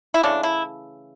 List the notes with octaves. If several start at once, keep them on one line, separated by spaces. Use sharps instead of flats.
E4
C#3 E3 A3 D4
E4